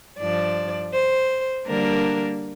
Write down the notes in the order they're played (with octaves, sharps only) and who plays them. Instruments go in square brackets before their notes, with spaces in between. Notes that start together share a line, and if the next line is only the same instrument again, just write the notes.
[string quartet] G2 F3 D4 D5
C5
D3 G3 A#3 D4 A#4